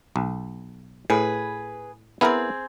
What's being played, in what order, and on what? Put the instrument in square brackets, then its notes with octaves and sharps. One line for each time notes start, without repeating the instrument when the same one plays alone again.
[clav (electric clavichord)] B1
[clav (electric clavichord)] A2 [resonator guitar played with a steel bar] G#4 B4
[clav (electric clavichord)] B3 E4 A#4 [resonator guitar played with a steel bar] C4 G#4